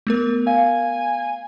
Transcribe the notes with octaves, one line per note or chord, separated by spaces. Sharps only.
A3 B3 A#4
F5 G#5